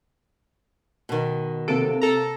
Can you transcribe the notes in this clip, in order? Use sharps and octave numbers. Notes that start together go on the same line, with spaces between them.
B2 D#3
C3 A#3 A4 D7
A4 A#5